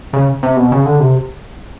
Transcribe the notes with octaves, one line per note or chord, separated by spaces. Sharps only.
C#3
C3
B2
C#3
D3
C3